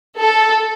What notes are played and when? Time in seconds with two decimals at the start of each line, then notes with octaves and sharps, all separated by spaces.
0.19 A4